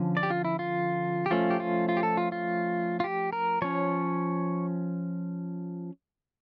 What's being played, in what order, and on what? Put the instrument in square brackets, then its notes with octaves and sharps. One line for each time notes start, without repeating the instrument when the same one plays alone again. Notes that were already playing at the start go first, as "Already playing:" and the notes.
Already playing: [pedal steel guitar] D3 F3 C#4
D5
G4
F4
E4
F4
G4
F3 A3 C#4 F4
G4
F4
F4
G4
A4
F4
F4
F4
G4
A#4
F3 C#4 C#5